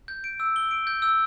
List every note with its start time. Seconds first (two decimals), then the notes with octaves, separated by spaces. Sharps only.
0.08 G6
0.24 D7
0.40 E6
0.56 G7
0.71 D7
0.87 G6
1.02 E6